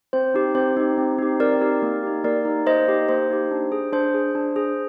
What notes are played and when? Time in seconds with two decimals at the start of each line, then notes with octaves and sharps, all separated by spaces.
0.13 C4 C5
0.34 D#4 G4
0.55 C4 C5
0.77 D#4 G4
0.98 C4
1.19 D#4 G4
1.40 C4 A#4 D5
1.61 D#4 G4
1.82 A#3
2.03 D#4 G4
2.24 A#3 A#4 D5
2.45 D#4 G4
2.67 A#3 C5 D#5
2.88 D#4 G4
3.09 A#3 C5
3.30 D#4 G4
3.51 D4
3.72 G#4
3.93 D4 C5
4.14 G#4
4.35 D4
4.56 G#4